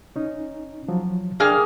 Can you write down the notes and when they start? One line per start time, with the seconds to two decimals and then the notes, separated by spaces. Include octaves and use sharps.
0.16 C#4 D#4
0.88 F3 F#3
1.40 A#3 D4 G#4 G5 F6